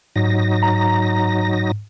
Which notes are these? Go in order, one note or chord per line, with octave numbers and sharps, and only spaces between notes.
G#2 F#3 D#4 A#6
A#5